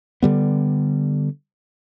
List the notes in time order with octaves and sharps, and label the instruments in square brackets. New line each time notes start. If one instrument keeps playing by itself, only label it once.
[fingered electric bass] D3 G3 B3